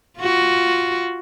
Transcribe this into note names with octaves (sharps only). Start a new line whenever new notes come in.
F4 F#4